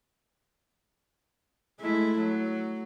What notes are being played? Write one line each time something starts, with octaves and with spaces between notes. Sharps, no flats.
G#3 A3 E4
F#3